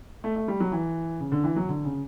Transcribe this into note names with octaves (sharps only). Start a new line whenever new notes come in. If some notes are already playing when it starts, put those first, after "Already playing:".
A3
A3
G3
F#3
E3
C#3
D3
E3
F#3
D3
C#3